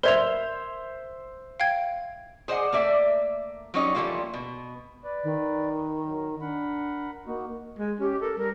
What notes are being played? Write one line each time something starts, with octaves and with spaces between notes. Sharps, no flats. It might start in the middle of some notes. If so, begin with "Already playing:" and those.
A#4 C5 E5 G#6 F7
F5 G5 G#6
G#4 C5 D5 D#5 F#5 G#5
A3 A#3 D5 E5
F#3 G3 C#4 D#4 C#5 D#5
E3 F3 G3 A3 A#3 F4
B2
B4 D5
D#3
F#3
D4 A#4 F#5 B5
A#3 D#4 F#4
G#3
C#4 G4
A4 A#4
G3 A#4